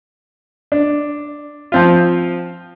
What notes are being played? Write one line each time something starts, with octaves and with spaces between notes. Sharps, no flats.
D4
F3 C4 F4